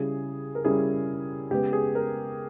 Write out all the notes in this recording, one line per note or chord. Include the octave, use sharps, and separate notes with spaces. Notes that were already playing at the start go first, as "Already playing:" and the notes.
Already playing: C#3 G3 C#4 E4 G#4
A#4
C#3 G3 C#4 E4 G#4
C#3 G#3 B3 G4
G#4
A#4